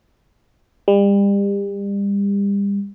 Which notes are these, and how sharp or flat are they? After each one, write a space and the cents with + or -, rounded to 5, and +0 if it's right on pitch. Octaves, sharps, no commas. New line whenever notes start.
G3 +35